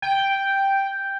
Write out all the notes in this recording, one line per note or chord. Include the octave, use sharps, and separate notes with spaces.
G5